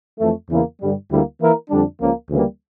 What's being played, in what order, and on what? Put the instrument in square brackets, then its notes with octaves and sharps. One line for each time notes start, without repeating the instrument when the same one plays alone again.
[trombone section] F2 E3 A3
E2 C#3 E3 A#3 E4
G2 D3 G3
D2 D3 G3 A#3 E4
E3 A#3 E4 A#4
F2 D3 G3 D4
C#2 C#3 F3 A#3
D2 C#3 E3 G3 A#3